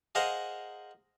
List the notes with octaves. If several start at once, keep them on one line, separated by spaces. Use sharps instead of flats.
G#4 A#4 C5 D#5 F5 F#5